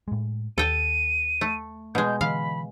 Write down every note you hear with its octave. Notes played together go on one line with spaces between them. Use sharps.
A2 G#3
D#2 A4 G5 D#7
A3
B2 G#3 G6
D3 E3 G#3 F5 B5